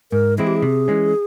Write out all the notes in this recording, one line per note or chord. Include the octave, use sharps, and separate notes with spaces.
G#2 A#4
E3 G#3 C4 E4 G#4
G4
G#4
C3
E3 G#3 C#4